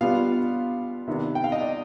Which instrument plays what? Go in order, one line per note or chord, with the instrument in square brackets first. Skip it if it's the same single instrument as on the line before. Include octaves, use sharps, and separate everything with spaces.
[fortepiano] B2 G3 B3 D4 F4 F5
C3 D#3 B3 D4
G5
F5
D#5
D5